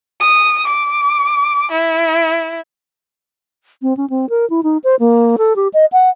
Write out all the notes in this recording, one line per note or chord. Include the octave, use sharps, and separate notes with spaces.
D#6
D6
E4
C4
C#4
C4
A#4
E4
D#4
C5
A#3
A4
G4
D#5
F#5